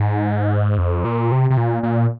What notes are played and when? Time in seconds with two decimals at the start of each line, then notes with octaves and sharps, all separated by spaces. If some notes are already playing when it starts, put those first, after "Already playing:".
Already playing: G#2
0.78 F2
1.04 A#2
1.32 C3
1.50 C3
1.57 A#2
1.83 A#2